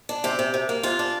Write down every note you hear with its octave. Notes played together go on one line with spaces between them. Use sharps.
D4
C3 G4
C3
C3
A#3
C3 F4
D4